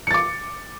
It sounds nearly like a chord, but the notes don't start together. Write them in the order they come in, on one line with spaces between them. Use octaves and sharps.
C#7 A6 D6